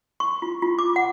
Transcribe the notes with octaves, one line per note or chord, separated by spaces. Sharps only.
C#6
F4
F4
D6
F#5